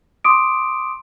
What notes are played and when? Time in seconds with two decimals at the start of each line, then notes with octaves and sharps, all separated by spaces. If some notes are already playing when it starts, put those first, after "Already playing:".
0.25 C6 D6 D#6 D7